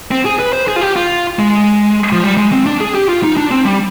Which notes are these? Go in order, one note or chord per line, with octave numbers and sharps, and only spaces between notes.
C4
G#4
B4
C5
G#4
F4
G4
F4
G#3
F3
G3
G#3
C4
D4
G#4
G4
F4
D#4
D4
C4
G3